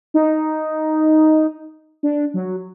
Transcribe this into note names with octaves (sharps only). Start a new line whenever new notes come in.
D#4
D4
F#3